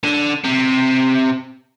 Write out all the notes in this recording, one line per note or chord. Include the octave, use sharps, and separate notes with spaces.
D3
C3